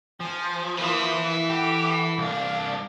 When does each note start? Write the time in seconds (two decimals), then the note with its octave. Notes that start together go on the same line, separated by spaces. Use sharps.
0.20 F3 G#5
0.79 E3 A#3 E4 D#6
1.50 G4 A4 F#5
2.18 C2 D4 F5